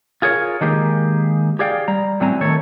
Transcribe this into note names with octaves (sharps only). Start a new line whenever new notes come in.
F4 G#4 A#4 C#5
D#3 G#3 A#3 D#4 G4 G#4
G4 G#4 D5 F5 G5
G3 A#5
A2 F#3 G3 C4 G#5 A#5
D#3 A3 A4 C#5